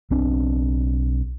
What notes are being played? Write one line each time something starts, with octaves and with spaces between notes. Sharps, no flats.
B1 B3 C4 D4